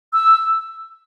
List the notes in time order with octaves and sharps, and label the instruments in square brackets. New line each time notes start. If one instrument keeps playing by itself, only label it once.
[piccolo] E6